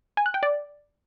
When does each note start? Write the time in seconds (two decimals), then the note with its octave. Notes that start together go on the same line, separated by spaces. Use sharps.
0.17 G#5
0.26 F#6
0.34 G5
0.43 D5